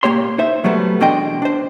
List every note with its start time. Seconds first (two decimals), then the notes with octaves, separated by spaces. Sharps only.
0.03 A#2 F#3 A#3 G4 C#5 C6
0.38 D#4 C5 E5
0.64 B2 F#3 G3 A3 B3
1.00 E2 B2 D4 D#5 G5 C6
1.42 D4 C5